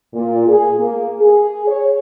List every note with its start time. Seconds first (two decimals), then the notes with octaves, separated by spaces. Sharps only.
0.14 A#2
0.47 G#4
0.80 A#3
1.20 G#4
1.67 C#5